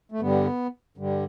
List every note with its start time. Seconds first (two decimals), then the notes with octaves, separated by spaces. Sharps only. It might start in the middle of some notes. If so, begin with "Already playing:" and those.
0.12 A3
0.20 G2 D3 G3 B3
0.97 G2 D3 G3